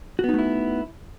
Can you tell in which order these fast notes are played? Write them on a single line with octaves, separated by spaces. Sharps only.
F#4 B3 D#4 A3 E4